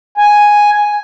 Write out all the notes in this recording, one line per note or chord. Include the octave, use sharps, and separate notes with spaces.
G#5